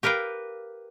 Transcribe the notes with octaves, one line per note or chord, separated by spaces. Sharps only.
G4 A#4 B4 F5 G5